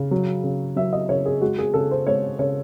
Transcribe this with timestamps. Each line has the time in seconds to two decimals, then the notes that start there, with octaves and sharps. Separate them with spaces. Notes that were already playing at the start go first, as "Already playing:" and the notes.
Already playing: C#3
0.11 F#3
0.44 C#3
0.76 F#3 E5
0.93 D#5
1.09 C#3 C#5
1.26 G#4
1.42 G#3 F#4
1.58 G#4
1.74 C#3 A4
1.91 C5
2.07 G#3 C#5
2.39 C#3 C#5